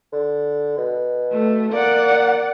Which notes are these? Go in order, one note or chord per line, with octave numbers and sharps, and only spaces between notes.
D3
B2
A3
A#3 D5 F#5